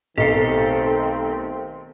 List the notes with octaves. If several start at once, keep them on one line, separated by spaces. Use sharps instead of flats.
B1 D#3 A3 C4 G4 A4 A#4 C7